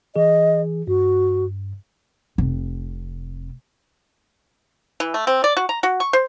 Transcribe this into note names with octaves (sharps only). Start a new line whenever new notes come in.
E3 G#4 D#5
G2 F#4
F1 C3
E3
A3
C4
D5
F#4
A#5
F#4
C#6
C5